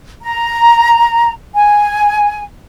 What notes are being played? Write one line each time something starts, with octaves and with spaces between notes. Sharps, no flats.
A#5
G#5